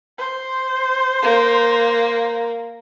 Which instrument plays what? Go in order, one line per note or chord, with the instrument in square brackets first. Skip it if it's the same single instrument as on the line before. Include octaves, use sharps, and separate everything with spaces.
[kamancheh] C5
[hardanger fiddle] A#3